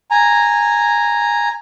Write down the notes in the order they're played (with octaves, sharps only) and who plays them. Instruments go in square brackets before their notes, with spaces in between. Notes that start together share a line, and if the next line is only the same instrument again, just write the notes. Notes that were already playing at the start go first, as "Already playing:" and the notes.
[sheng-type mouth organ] G#5 A#5